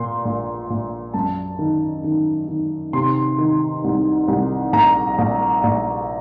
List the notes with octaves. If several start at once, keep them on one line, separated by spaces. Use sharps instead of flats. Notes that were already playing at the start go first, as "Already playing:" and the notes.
Already playing: A#2 C6
A#1
A#1
F#2 A5
D#3
D#3
D#3
C3 C6
D#3
C2
C2
A#1 A#5
A#1
A#1